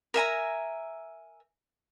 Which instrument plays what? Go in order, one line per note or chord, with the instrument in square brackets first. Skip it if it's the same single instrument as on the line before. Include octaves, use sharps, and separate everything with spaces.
[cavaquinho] A#4 E5 G#5 A#5